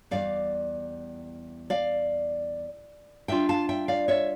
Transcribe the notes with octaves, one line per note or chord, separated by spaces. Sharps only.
E2 C#3 G3 D5 F5
D5 F5
D3 G3 D4 F4 E5 G5
F5 A5
E5 G5
D5 F5
C#5 E5